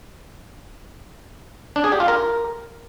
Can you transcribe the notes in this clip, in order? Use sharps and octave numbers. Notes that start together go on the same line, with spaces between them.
D4
G#4
G4
F4
A#4